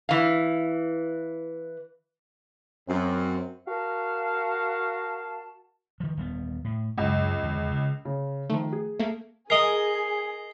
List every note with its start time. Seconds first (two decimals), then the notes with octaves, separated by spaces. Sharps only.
0.09 E3 F5
2.89 F#2 C4
3.68 F#4 A#4 F5 A5
6.00 D#3 F3
6.17 D#1 G3 B3
6.64 A2
6.98 C#2 F#2 A#3
7.43 E2 D3
7.71 C#3
8.05 C#3
8.50 D#3 F3 A3
8.73 G#4
8.99 A3 A#3
9.50 G#4 A#4 D#5 C7